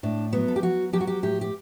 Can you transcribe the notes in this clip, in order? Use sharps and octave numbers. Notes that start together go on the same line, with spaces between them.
A2 D4
F#3 B3
A4
G4
F#3 F#4
F#3 G4
F#4
G4
A2 G4
G4